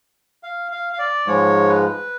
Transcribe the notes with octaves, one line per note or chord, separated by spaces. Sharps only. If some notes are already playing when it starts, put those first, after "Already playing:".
F5
F5
F5
D5
G#2 F3 G#3 C#5
B4